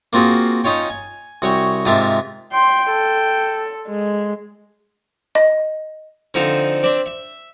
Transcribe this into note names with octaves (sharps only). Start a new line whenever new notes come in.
A#3 C4 F4 F#4 G#4
C#4 D#4 F4 C#5 G5
G#5
C2 F#4 C#5 G5 G#5
G#2 C3 F4 A#4 E5 A5
G5 C6
A4
G#3
D#5
D3 F3 C4 D#4
C4 D4 D5 E5
E5